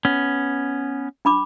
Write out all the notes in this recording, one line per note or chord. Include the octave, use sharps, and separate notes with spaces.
B3 C#4
D4 B5 D6